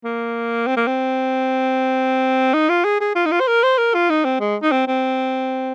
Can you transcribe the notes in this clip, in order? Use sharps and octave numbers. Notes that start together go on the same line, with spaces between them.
A#3
C4
A#3
C4
D#4
F4
G#4
G#4
F4
D#4
F4
C5
A#4
C5
A#4
F4
D#4
C4
G#3
D#4
C4
C4